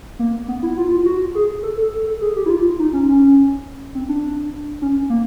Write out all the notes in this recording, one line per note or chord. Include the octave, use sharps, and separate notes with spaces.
A#3
B3
E4
F4
F4
F#4
G#4
A4
A4
A4
G#4
G4
E4
F4
D#4
C#4
C#4
C4
D4
C#4
A#3